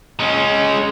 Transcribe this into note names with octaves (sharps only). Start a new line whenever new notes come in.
G#3 C#4